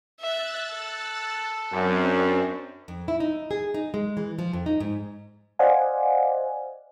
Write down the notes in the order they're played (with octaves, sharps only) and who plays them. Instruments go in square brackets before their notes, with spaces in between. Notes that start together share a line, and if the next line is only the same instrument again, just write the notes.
[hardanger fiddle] E5 [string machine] E6 F#6 A6
[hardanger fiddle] A4
[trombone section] F#2 [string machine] C4 D4
[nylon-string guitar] F2
E4
D#4
G#4
D#4
G#3
E3
F3
F2
D#4
G#2
[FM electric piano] C5 D5 D#5 F5 F#5 G#5